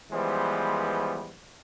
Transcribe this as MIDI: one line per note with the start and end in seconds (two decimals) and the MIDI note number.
0.12 1.35 52
0.12 1.35 53
0.12 1.35 55
0.12 1.35 56
0.12 1.35 59
0.12 1.35 72